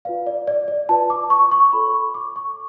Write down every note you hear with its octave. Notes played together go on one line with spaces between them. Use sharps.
F4 B4 D5 F5
D5
D5
D5
F4 B4 D5 A5
D6
C#6
C#6
F4 A4 C#5 B5
C#6
D6
C#6